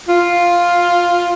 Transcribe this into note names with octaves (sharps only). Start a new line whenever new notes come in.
F4